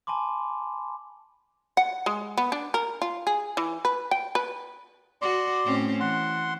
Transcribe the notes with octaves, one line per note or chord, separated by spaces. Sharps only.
G#5 A5 B5 C6 D6
F#5
G#3
B3
D4
A#4
F4
G#4
E3
B4
G5
B4
F#4 D5 C6
A2 C4 C#4
E3 F#5 C6